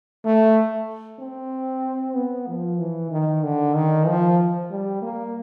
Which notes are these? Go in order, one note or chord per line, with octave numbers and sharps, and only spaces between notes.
A3
C4
B3
F3
E3
D#3
D3
D#3
F3
G3
A#3